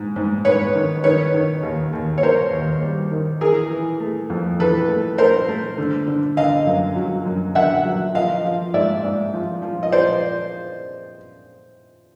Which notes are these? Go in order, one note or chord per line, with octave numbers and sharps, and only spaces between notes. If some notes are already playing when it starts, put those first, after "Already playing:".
Already playing: G#2
G#2
G#2 B4 C#5
D#3
D#3 B4 C#5
D#3
D#2
D#2
C#5
D#3 A#4 C5
D#2
G3
D#3
E3 G#4 A#4
E3
A3
F2
E3 A4 B4
A3
A3 A#4 C5
A3
D3
D3
D3 D#5 F5
F#2
F#3
F#2
D3 E5 F#5
F#3
F3 D#5 F5
F3
G#2 D5 E5
G#2
F3
F3
D#5
F3 C5 D5